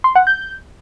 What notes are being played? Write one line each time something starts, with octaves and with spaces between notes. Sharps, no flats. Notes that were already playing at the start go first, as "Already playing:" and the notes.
C6
F#5
G6